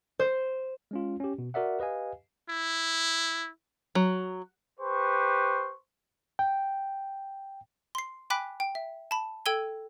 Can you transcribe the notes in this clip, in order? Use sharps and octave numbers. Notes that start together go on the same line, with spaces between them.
C5
G#3 C#4 F4
C#4 G4
B2
F#4 A#4 D5 E5 F#5
G4 B4 D#5 F5 G#5
E4
F#3
G4 B4 C5 C#6
G5
C6 C7
G5 G#5 B5 D6 F#6 B6
G5
E5
A5 B5
A4 G5 E6 G#6 D#7 G7